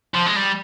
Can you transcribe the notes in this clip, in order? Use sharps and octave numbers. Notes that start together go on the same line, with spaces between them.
F3
G#3
G3